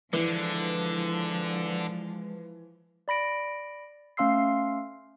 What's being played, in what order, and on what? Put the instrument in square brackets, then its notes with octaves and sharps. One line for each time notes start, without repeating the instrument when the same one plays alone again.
[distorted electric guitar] D3 [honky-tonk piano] E3 [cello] F3 [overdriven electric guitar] G#3
[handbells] D5 B5 A#6 D7
A3 C#4 F5 C6 E6 C7